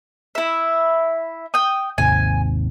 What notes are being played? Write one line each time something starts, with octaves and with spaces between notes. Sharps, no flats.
E4 E5
G5 D#6
G#1 D#2 C3 G#5